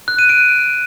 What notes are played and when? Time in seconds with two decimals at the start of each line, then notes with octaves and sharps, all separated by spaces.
0.08 F#6
0.19 D#7
0.29 D7